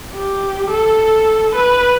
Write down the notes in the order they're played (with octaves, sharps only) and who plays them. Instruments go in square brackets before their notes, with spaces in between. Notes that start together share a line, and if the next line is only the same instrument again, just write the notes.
[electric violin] G4
A4
B4